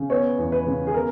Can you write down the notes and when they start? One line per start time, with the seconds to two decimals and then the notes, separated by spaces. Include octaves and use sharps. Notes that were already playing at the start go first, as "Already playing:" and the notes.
Already playing: C#3
0.10 B3 C#5
0.38 E2
0.52 B4
0.67 C#3
0.87 G#4
0.94 B3 A#4